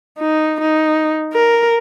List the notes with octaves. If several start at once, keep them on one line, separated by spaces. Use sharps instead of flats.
D#4
D#4
A#4